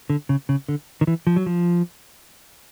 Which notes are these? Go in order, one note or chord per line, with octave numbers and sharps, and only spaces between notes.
D3
C#3
C#3
D3
D#3
E3
F3
F#3
F3